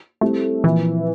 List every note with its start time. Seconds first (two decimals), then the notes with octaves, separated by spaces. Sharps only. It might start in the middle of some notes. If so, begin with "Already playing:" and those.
0.21 G3 A3 C4 E4 G4
0.64 A#2 E3 F3 A#3